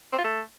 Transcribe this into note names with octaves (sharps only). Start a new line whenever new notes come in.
C4
F4
A3